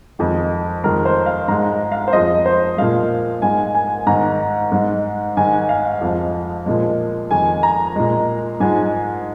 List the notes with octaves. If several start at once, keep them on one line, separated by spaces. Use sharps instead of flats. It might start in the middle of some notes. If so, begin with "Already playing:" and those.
F2 D#3 G#3
F2 D#3 G#3 A#4
C5
F5
G#2 G#3 A#5
F5
C5
F2 F3 G#3 D#5
C5
A#2 F3 G#3 F5
G#2 G#3 G#5
G#5
G#2 D#3 G#3 A#5
G#2 G#3
G#2 D#3 G#3 G#5
F5
F2 F3 G#3
A#2 F3 G#3
F2 D#3 G#3 G#5
A#5
A#2 G#3
G#2 F3 G#3 G#5